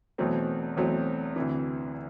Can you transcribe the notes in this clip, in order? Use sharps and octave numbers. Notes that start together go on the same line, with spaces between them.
E2 B2 F#3 A3 C4
E2 B2 F#3 A3 C4
D2 C3 E3